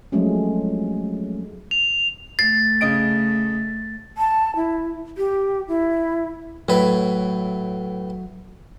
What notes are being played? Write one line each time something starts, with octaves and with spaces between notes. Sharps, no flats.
F3 F#3 G#3 A3 C4 C#4
F7
A3 A6 C7
C#3 D#5 D7
A5
E4
G4
E4
A2 F#3 B4